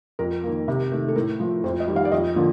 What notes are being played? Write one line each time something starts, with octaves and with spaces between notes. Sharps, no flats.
F2 A#4
D#3 A#3
C3
D#3 A3
A4
A2 A#4
F3 A3
F2 C5
D#5
D#3 G3
F5
D5
F2 D#5
D3 F3 A#3